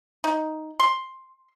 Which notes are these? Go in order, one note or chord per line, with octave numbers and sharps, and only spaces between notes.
D#4
C6